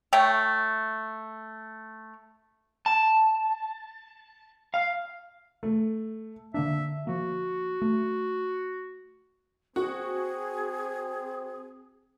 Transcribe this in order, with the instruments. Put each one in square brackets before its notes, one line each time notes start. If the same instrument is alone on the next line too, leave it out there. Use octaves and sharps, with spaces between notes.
[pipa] A3 C#5 G5
[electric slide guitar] A5
F5
[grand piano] A3
[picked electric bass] D3 A#3 D4 [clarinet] E5
[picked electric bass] F3 A#3 [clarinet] F#4
[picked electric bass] A3
[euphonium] C4 [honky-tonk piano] F#4 [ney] G#4